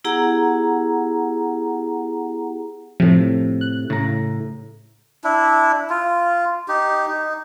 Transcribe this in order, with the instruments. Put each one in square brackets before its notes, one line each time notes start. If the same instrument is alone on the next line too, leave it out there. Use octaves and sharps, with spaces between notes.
[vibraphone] B3 E4 G4 G#4 F#5 A#5
[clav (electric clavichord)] A2 C3 [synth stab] F3
[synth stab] F#6
[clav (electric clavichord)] A2 A#5 [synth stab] C#3
[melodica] D4 E4
F4
D#4 G4
D#4